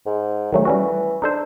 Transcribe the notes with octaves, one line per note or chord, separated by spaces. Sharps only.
G#2
D2 D#3 F#3 A3
E3 G3 C#4 F#4
D4 D#4 A4 C5